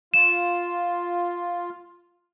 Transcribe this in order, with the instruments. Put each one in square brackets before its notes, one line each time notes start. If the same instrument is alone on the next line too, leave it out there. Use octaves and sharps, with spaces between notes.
[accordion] F4 [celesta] E7